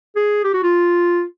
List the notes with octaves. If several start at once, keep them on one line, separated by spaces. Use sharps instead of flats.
G#4
G4
F#4
F4